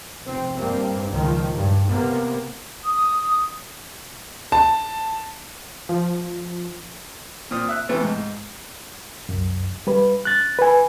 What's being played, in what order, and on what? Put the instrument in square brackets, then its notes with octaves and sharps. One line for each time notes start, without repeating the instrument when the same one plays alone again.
[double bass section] F1 C4
G2 G3 A#3 C4
C#2 A#2 D#3 F3
G2
C3 A#3 B3
[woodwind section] D#6
[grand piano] A5
[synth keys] F3
[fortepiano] A#2 C4 D#6 F6
E5 F#6
C3 E3 A3 B3
G#2
[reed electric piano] C2 F#2
G3 B4
F#6 A6
B4 G#5